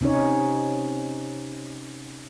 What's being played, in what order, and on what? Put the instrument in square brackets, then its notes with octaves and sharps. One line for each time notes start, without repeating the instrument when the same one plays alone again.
[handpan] C3 C#4 D#4 C#5